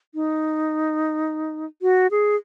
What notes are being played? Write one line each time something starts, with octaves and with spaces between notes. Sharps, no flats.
D#4
F#4
G#4